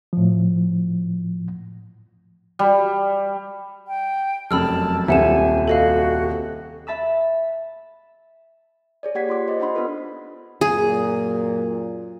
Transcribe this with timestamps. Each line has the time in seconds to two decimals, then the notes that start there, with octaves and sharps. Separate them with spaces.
0.13 A2 F3
2.59 G3
3.88 G5
4.51 F1 F#2 A5 B5 E6 F6
5.08 D#1 C2 C4 E5 F#5 G#5 E7
5.68 F#4 A4 D#5 F5
6.87 E5 A5 B5 E6
9.03 G#4 C#5 D5
9.15 A#3 G4 F#5 G#6 B6
9.29 F4 C6 D6
9.48 C5 D#5
9.60 D4 D#4 F#5 B5 C6
9.75 B3 D4 F4 A4 B4
10.61 F#2 A#2 G#4